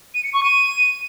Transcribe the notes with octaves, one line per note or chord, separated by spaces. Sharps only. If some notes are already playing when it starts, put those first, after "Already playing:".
D#7
C#7
C#6
D#7